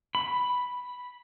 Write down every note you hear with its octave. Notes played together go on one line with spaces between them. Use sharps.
B5